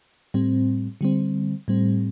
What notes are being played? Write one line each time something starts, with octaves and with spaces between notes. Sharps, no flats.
A2 G3 C4
D3 G3 C4
A2 G3 C4